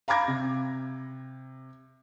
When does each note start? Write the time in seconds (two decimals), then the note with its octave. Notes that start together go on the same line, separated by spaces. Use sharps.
0.08 F5 A#5 B5 D6 G#6 A#6
0.28 C3